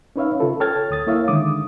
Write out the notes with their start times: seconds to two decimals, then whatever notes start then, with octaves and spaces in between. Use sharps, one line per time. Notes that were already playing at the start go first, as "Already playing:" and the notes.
0.16 C#4 D#4 B4 C#5 E5 F5
0.39 C#3 F4 A4 B4
0.60 A4 C#5 G5 F6 G#6 A6
0.90 D2 D#6 A6
1.07 A#3 E4 C#5 E5 F5
1.28 D3 D#3 G#3 D6 D#6